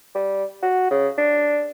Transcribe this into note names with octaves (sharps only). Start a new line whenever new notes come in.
G3
F#4
C#3
D4